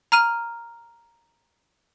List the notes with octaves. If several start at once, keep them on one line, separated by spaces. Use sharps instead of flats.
A#5 F6 D#7